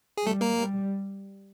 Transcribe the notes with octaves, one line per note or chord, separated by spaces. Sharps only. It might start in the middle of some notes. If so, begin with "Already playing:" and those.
G#4
G3 A3 A4
A#3 A#4
G3